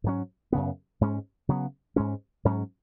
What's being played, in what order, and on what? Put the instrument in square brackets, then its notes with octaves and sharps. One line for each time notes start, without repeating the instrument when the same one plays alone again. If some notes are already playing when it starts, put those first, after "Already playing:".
[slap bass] G#2 F#3 C#4
F#2 C#3 B3
G#2 G#3 C#4
C#3 F#3 B3
G#2 G#3 C#4
G#2 F#3 C#4